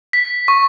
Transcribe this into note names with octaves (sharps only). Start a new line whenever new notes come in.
B6
C#6